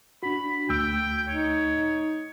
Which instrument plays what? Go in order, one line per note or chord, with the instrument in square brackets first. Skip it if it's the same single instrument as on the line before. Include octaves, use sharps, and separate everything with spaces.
[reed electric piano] D4 F#4 [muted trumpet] B5
[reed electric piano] D2 A3 E6 [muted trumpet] G5
[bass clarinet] D#4 [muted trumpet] C#5